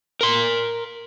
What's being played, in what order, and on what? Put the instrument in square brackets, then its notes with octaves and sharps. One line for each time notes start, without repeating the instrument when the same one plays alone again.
[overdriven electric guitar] A#4 C6